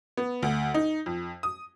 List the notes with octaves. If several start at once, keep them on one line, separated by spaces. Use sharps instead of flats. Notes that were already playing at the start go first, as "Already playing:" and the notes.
B3
D2
D#4
F2
D#6